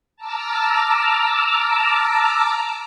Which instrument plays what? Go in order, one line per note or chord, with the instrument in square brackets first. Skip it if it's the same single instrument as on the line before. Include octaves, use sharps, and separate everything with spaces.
[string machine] A5 A#5 D6 E6 F6